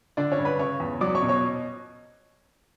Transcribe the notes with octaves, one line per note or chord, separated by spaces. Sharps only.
D3 D4 D5
C#4 C#5
G2
B4 B5
C#3 C#5 C#6
E2
F#3 D5 D6
C#5 C#6
B2
C#5 C#6